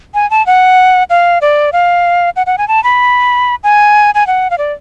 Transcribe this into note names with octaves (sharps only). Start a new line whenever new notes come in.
G#5
A5
F#5
F5
D5
F5
F#5
F#5
G#5
A5
B5
G#5
G#5
F#5
F5
D5